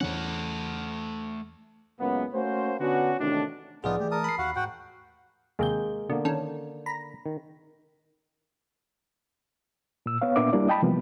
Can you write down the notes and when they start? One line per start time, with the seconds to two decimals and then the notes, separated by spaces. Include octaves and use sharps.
0.01 E2 E3 A3 C#4 F#5
2.00 C#2 F#2 C#3 A#3 B3
2.34 A3 A#3 C#4 F#4 C5
2.80 D3 B3 C#4 D4 F#4
3.20 A1 D#2 A2 C3 D#3 D4
3.84 C2 A2 F3 B3 D#4 F4 G#4 D5
4.00 E3 F3 A3 G4
4.11 A#4 A5 D#6
4.24 B5 C7
4.38 D#2 F#4 F5 F#5
4.56 G#2 F#4 F#5 G5
5.59 D#2 C3 G#3 A#3 G#4 G6
6.10 B2 D3 A#3
6.25 D#3 C#4 A4
6.86 A#5 B5
7.26 D#3
10.06 A#2 E6
10.22 B3 C#5 F5
10.36 A#2 A#3 B3 D4 E5 D6
10.53 G3 A#3 D4 E4 D5
10.69 D#5 G5 A5 B5
10.82 C3 E3 F3 G3 A#3 B3